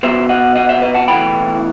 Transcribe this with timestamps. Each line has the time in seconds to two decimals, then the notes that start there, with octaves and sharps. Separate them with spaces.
0.03 B2 F#3 B3 C5 E5
0.29 D#5 F#5
0.55 D#5 F#5
0.69 C5 E5
0.82 B4 D#5
0.94 F#5 A5
1.08 B1 A2 E3 G5 B5